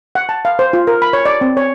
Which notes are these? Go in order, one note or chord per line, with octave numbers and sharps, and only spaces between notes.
F#5
A5
F5
C5
F4
A#4
B5
C#5
D5
C4
C#5